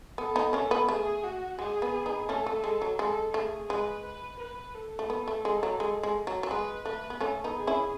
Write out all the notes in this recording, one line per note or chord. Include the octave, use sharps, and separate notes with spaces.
B3 A4
B3 D#4
A3 C#4
B3
A3 G#4
F#4
G#3 G#4
B3
B3 D#4
A3 C#4 A4
A3
G#3
F#3
G#3 A4
A3 G#4
G#3 B4
B4
B4
A4
A3
B3
A3
G#3
F#3
G#3
G#3
F#3
F#3
G#3 B4
A3 B4
B3
A3 C#4 A4
B3 D#4
G#4
C#4 E4